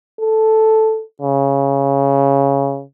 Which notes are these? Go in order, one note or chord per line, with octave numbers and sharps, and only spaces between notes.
A4
C#3